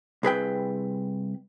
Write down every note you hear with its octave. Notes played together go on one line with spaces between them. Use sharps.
C2 G#4 B4 G5